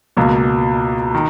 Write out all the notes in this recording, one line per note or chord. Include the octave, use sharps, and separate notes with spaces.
C#2 B2 A#3
D#3